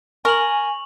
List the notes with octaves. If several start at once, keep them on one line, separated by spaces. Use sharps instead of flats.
A#4 G#5 C#6 F7 F#7